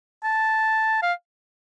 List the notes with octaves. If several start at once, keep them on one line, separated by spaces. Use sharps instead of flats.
A5
F5